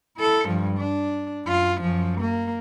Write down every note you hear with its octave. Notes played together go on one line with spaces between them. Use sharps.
E4 A4
G2 F3
D4
F#2 F4
F#2 F3
A#3